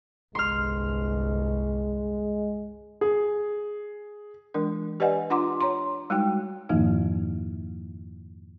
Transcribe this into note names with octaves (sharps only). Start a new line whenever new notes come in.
G1 C2 G#3 C6 F6
G#4
E3 G#3 D4 A#4
G4 B4 D5 D#5 F#5 G#5
D4 F4 F#5 A#5 C6 D6
C#5 A#5 C6
G3 G#3 D#4 F#4 G5
F2 G#2 D#3 F3 A#3 D#4